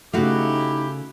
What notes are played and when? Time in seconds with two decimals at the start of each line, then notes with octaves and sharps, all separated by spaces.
0.13 C#3 A3 D#4 E4 F#4 G4 F5